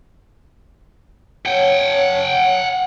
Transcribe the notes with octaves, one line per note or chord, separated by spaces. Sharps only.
C#5 F#5 G5